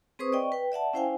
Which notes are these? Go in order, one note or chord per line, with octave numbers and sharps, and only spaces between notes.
C4 G#4 B4 C5 C#6 D#6
D5 D#5 G5 C#6
B4 G5
D5 E5 F#5 A5
C#4 E4 C5 F5 G5 G#5